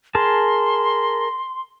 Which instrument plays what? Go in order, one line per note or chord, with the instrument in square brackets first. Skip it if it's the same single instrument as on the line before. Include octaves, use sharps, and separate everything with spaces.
[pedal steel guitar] G#4 A#4 A5 [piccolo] C6